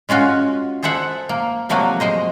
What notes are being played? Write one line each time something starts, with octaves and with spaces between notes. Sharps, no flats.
G#3 C#4 F4 F#4
G#4 A4 C5 E5 F#5
A#3
C3 F3 F#3 A3 A#3 F#4
G#3 C5 D#5